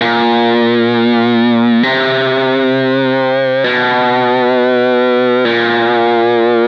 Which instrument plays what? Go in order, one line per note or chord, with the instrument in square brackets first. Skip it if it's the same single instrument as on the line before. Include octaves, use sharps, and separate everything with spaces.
[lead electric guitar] A#2
C3
B2
A#2